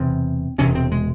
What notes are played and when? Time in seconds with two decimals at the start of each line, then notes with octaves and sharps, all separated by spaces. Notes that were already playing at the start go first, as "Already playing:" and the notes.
Already playing: E1 E2 C3 C4
0.58 E1 E2 C3 C#4
0.75 C4
0.91 G#3